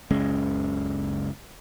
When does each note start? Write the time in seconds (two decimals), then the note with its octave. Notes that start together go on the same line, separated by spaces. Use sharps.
0.10 F#1 C#2 G#3 C#4